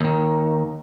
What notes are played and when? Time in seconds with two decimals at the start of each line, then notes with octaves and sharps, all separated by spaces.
0.01 D#2 D#3